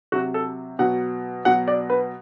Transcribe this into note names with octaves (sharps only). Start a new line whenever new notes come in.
C3 F#3 F#4
A4
B2 F#3 F#5
B2 F#3 F#5
D5
B4